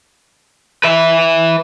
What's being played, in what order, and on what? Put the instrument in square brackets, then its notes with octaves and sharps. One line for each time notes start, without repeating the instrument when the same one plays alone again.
[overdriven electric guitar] B4 E5